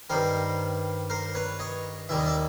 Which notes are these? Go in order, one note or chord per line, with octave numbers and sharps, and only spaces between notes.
G2 D#3 G3 A#4 C5
A#4 C5
B4 C#5
C#5 D#5
D#2 D#3 G3 E5
D#5
D5 E5